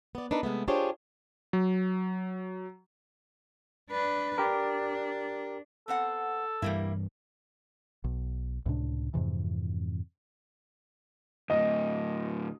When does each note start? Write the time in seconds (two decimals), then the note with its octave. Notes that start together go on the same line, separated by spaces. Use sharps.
0.15 B3 D5
0.31 D4 D#4 A#4 B4
0.43 C3 G#3 A3 B3
0.68 D4 F4 G4 G#4 C5 C#5
1.53 F#3
3.91 D4 B4
4.38 D4 G4 A#4
5.88 B3 C4 A4 F#5
6.62 G2 E3 G3 A#3 E4
8.04 B1
8.66 C#2 A2 C3 D4
9.14 F2 G#2 C3 E3
11.50 D2 A2 D#5